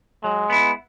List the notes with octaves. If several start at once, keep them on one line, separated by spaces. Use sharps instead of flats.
F#3 G#3
B3 E4